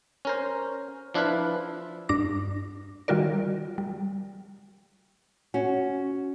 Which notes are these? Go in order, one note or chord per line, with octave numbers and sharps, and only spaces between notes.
C#4 A#4 C5
F3 D4 E4 F4 B4
G2 D4 D6 A#6
D#3 G3 F4 F#4 A#4 D5
G3
C#4 F#4